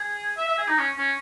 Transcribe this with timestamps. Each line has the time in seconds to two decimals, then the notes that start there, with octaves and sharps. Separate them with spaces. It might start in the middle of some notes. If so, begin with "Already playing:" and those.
Already playing: G#4
0.37 E5
0.48 E5
0.58 G#4
0.68 D#4
0.78 C#4
0.98 C#4